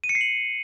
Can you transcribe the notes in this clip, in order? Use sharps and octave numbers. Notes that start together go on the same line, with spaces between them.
D#7
C#7
C7
F#7